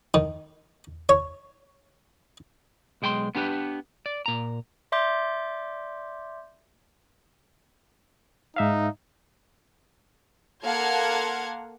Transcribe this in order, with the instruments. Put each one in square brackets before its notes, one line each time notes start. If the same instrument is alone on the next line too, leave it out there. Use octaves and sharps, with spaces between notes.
[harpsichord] D#3
C#5
[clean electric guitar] B1 G#3 G5 G#5 C6
B3 D4 G4 A#4 B4
D5
A#2 A#5
[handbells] D5 E5 C6 D6 G6
[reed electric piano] G#2 E5 F5 [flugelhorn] D#4
[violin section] A#3 A4 F5 F#5 C6 G#6